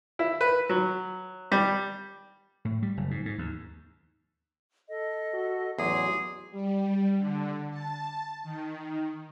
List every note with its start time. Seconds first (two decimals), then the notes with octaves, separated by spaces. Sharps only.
0.19 E4
0.41 B4
0.70 F#3
1.52 G3
2.65 A2
2.82 G3
2.97 F#1
3.11 G#2
3.25 G#2
3.38 D#2
4.89 A4 D#5
5.33 F#4
5.79 A1 E2 F#3 G#4 C6 D6
6.51 G3
7.17 D3
7.70 A5
8.43 D#3